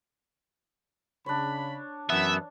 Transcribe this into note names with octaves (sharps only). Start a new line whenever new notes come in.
C#3 D4 C#5 B5
F#2 E3 B3 E5